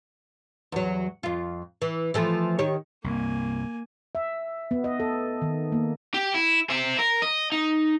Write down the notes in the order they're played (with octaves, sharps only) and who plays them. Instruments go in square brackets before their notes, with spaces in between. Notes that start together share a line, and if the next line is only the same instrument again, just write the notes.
[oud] E2 F#3
F2 F4
E3
E3 F3 A3
D#3 G4 C#5
[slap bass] C2 G2 [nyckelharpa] A#3 G#5
[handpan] E5
B3
D#5
A4
D#3
A#3
[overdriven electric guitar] G4
E4
C5 E5
A#4
D#5
D#4